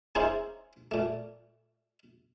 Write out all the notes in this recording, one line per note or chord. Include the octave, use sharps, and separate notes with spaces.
A#3 C#4 D#4 E4 G#4 C5
A#2 A3